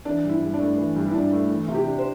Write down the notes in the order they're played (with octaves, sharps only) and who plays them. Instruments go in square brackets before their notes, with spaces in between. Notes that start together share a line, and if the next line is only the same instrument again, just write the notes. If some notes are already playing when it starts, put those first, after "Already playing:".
[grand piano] E3 [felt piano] D4
[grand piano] G2
[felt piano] E4
[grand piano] G2
[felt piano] D4
[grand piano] A3
E3
G2
[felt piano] E4
[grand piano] G2 [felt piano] D4
[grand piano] A3
E3
C3
[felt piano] G4
[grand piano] D4
[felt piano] C5